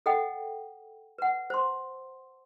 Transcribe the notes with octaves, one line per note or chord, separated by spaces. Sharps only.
A4 D#5 F#5 G5
B4 F#5
C5 C6